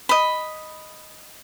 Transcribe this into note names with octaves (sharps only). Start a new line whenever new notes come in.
D#5 B5